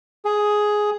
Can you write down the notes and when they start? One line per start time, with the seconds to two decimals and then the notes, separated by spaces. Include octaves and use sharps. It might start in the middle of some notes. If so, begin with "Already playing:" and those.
0.25 G#4